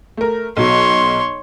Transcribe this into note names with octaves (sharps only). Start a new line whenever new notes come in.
A3 A#4
B1 F#3 C#5 C6